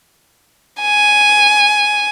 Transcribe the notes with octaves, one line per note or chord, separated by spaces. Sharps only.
G#5